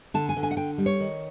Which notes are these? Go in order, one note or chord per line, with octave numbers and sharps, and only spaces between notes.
D3 A5
G#5
D3
G#5
F#5
D3 G5
G3
C#5
D#3